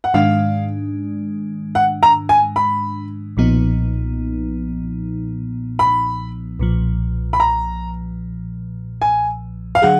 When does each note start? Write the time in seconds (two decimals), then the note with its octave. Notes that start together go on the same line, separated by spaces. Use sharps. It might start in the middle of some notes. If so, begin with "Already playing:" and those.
0.04 F#5
0.14 G#2 D#3 G#3 D4 F5
1.75 F#5
2.03 A#5
2.29 G#5
2.56 B5
3.37 B1 A#2 F3 B3 D#4
5.79 B5
6.60 B1 A#2 F3
7.33 B5
7.40 A#5
9.02 G#5
9.75 F5
9.82 D3 F#3 D4 G#4 F#5